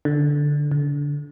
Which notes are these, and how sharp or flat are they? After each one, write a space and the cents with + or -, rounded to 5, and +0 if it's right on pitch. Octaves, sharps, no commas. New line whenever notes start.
D3 +0
D3 -25